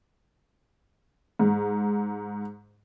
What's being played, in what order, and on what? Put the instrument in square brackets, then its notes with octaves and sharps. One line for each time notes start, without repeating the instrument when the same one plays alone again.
[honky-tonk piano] G#2